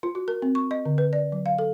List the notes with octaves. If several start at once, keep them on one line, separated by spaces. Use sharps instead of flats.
F4
F#4
A#4
C4
C#6
D#5
D3
B4
D5
F#3
F5
A4